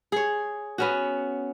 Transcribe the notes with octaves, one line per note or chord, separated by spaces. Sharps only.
G#4 C#5
B3 C#4 F#4